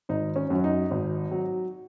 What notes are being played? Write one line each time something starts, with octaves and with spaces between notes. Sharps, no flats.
G#1 D#4
C#4
F#2 F#3
D#4
G#1
F#3